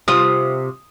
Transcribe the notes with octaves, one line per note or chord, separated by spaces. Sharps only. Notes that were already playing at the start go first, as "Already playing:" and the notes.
C3 F4 D#6